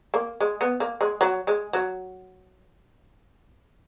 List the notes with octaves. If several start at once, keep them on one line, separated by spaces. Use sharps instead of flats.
A#3
G#3
B3
A#3
G#3
F#3
G#3
F#3